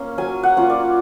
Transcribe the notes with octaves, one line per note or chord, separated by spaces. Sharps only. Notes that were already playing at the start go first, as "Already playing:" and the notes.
Already playing: A#3 C#4
F#3 G#5
F#5
A#3 C#4 F4
D5